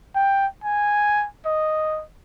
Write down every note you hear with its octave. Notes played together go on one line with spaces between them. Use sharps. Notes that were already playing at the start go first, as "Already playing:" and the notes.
G5
G#5
D#5